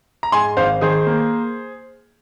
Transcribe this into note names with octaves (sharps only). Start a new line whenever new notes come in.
A#5
G#2 G#5 C6
G#1 C5 F5
D#3 G#4 C5
A#3